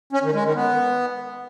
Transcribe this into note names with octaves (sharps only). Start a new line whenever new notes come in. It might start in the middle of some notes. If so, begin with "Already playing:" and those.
C#4
D#3
G#3
D#3
B3